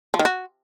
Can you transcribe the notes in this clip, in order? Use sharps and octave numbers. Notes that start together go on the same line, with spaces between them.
F3
D#3
F#4